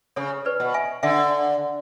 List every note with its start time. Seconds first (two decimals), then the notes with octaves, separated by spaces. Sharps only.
0.16 C#3 A4 C#5
0.45 B4 D5
0.60 B2
0.74 E5 G#5
1.03 D3 E5 G#5